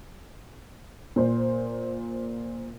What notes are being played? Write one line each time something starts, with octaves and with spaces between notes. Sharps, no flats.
A#2 C5